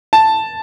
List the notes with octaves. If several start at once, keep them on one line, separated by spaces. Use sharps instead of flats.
A5